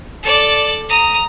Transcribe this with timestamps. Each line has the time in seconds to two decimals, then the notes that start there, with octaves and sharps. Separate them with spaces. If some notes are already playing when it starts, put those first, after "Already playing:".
0.23 A4 D5
0.89 A#5 D#6